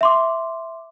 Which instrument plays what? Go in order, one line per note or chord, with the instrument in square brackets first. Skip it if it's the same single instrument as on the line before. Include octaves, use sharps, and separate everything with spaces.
[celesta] E5 C6 D6